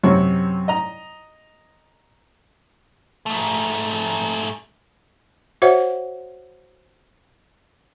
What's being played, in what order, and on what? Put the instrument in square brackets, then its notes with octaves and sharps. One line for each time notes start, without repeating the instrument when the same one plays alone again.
[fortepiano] F#2 C3 C#5
D#5 A#5
[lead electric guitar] G#2 A3
[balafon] F#4 C5 C#5 E5 F#5